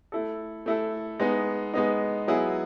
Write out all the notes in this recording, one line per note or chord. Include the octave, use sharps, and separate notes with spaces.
A3 E4 A4
A3 E4 A4
G#3 B3 D#4
G#3 B3 D#4
F#3 B3 E4 G#4